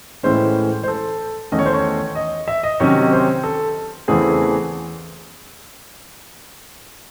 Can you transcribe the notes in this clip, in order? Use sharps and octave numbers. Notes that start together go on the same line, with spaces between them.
A2 E3 G#3 C#4 C5
C5
A4
E2 D#3 A3 C#4 D#5
C#5
C5
C#5
D#5
E5
D#5
C3 D#3 F#3 C#4 C#5
C5
A4
E2 C#3 E3 A3 C4 G#4